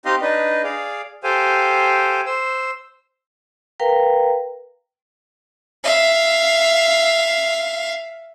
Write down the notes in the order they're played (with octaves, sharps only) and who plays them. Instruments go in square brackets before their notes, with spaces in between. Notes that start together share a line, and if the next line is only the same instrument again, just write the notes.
[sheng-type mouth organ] C4 D#4 G4 D#5 F5 C6
D4 D#4 B4 D#5
G#4 D5 F5
G4 A4 C5 F5 G5 G#5
C5 E6
[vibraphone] A#4 B4 F5 G5 A#5
[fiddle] E5 F5